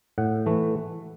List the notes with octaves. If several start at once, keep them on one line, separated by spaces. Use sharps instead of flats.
A2 F#5
E3 A3